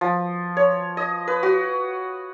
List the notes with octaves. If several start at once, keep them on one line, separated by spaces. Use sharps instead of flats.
F3
C#5
D#5
B4
F#4